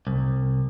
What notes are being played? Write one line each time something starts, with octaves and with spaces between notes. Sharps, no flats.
C2